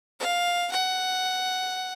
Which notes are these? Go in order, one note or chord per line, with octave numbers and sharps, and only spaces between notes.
F5
F#5